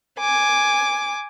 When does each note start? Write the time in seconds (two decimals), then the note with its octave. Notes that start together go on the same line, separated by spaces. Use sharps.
0.19 G#5 D6